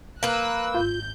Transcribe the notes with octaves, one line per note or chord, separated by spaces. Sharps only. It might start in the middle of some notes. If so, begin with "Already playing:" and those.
A#3 B4 A#5 E6 F#6
G#1 F4 G6